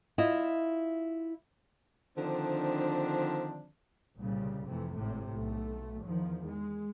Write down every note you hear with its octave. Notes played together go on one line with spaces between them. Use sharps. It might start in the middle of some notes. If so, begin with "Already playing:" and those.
E4 F4 D#5 E5
D3 D#3 F3 C4 D4
C2 A#2 C#3 G3
F2 C3 E3 A3
G#1 A2 C3
B1 A3
E2 D#3 F3
G#3